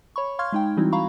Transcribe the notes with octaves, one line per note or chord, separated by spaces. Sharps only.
C#5 B5 C#6
F5 C6 C#6 F6 G#6
G#3 D#4 G5
E3 G3 C4 D#4 E4 F#4
F5 A#5 B5 C#6